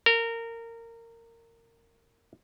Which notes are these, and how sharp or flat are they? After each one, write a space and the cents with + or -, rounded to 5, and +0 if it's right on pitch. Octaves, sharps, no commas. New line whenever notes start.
A#4 -20